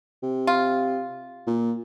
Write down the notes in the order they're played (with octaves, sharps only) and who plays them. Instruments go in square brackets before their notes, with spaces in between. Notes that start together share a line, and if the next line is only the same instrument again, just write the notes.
[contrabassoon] C3
[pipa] F4
[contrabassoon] A#2